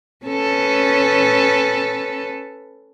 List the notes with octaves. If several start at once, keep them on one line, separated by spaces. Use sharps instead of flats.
C#4 A4 B4